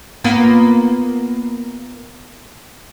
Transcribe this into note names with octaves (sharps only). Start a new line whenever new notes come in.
A#3 B3 F4